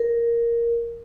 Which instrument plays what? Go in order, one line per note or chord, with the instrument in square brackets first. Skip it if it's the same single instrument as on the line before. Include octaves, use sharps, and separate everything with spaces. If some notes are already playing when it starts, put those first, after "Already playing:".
Already playing: [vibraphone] A#4